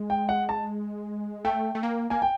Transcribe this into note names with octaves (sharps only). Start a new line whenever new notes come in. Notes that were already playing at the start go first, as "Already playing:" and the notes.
Already playing: G#3
G5
F#5
A5
A3 G5
A3
A#3
A#3 G#5
G5